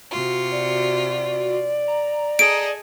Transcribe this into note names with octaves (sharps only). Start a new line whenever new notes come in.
C3 F4 F#4
D5
A#5
G#4 A4 D#5 D7